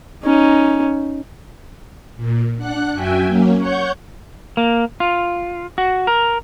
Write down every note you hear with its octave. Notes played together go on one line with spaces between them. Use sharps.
C#4 D#4
A#2
D4 F#5 F#6
F#2 F#4 E5 G5 G#5
F#3 A#3 C#4
C#5 F#5 C#6 G6
A#3
F4
F#4
A#4